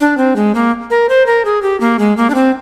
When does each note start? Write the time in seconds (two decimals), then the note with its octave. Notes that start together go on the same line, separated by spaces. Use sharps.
0.01 D4
0.17 C4
0.36 G#3
0.55 A#3
0.90 A#4
1.09 C5
1.26 A#4
1.45 G#4
1.62 G4
1.80 A#3
1.99 G#3
2.17 A#3
2.30 D4
2.35 C4